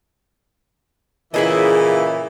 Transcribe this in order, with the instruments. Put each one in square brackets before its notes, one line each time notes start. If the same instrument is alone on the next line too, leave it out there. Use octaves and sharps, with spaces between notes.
[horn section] A#2 C#3 E3 [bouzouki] E4 G#4 D#5